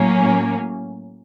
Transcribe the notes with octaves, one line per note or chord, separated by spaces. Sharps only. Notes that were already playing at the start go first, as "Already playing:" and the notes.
Already playing: A2 F#3 A#3 C#4